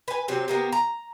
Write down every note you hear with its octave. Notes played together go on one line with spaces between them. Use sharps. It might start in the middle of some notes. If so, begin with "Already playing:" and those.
B4 G#5
C3 F#3 C4
C3 A#3 B3
A#5